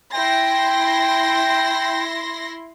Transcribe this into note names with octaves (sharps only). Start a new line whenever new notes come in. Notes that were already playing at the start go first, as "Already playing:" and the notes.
E4 G5 C6 A#6